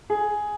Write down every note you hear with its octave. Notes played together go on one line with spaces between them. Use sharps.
G#4